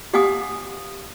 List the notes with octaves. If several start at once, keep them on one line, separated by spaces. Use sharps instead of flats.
G4 F5 F#5 G#5 D#6